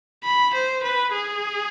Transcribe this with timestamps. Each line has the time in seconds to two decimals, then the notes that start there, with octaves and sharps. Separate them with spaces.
0.24 B5
0.54 C5
0.83 B4
1.12 G#4